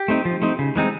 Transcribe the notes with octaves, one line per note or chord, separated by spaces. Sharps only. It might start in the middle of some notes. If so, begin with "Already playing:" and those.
Already playing: G4
A3 C4 D#4
F3
A3 C4 D#4
C#3
E3 G#3 C4 D#4